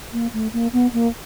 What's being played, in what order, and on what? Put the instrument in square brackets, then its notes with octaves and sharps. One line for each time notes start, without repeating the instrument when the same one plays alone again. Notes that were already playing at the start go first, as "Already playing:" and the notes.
[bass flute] A#3
A3
A#3
B3
A#3